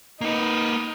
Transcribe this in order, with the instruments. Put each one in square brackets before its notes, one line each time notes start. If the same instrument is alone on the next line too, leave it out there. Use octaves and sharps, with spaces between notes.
[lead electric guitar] A#3 B4 [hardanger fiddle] D#4